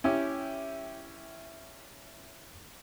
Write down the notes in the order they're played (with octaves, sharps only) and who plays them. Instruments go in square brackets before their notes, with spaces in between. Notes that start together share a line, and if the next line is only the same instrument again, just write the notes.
[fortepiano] C#4 E4 G4